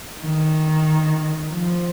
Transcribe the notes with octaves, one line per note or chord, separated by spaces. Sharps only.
D#3
F3